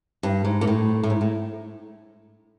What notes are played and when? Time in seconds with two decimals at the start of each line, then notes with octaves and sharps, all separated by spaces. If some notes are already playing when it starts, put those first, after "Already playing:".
0.23 G2
0.45 G#2
0.61 A#2
0.67 A2
1.03 A2
1.10 G#2
1.21 A2